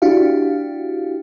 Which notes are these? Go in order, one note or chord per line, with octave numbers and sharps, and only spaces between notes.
D4 E4 F#4 G4 F5